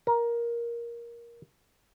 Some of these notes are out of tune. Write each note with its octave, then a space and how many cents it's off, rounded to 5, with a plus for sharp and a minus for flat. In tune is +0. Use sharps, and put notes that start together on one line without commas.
A#4 +15